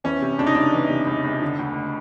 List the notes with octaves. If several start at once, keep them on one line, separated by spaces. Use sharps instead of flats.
E3 C#4
C3
C#2 D4
D#4
C#2 D4
E3
C3
C#2
C#2
D3
D2